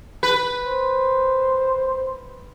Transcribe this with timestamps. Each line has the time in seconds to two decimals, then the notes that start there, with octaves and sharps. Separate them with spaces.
0.23 B4
0.66 C5